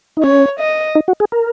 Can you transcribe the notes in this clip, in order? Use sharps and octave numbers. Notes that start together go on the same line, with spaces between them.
D#4
C#4 C#5
D#5
D#4
F#4
G#4
A#4